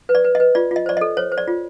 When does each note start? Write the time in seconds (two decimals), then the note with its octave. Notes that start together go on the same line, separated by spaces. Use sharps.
0.09 B4
0.15 D5
0.24 B4
0.35 D#5
0.40 B4
0.55 F4 D5
0.71 F4 D#5
0.86 C5 D5
0.97 A4 D#5
1.17 C5 C#5
1.32 C5
1.38 D5
1.48 F4